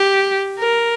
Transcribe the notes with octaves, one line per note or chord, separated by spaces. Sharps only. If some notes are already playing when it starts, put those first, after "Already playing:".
Already playing: G4
A#4